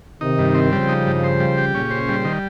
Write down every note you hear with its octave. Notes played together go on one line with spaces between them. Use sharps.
C3 D#3 D#4
G2
C4
C#3 F3 G3
D#4
G2
C5
G3
G4
A#2 C#3 C#4
C5
G3
D#3